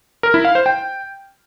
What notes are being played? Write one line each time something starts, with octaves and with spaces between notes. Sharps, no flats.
A#4
E4
F5
C5
G5